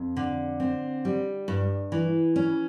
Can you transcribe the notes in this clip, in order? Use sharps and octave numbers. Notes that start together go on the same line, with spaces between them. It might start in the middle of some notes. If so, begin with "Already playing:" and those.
Already playing: F2
D3
C4
G3
G2
E3
C#4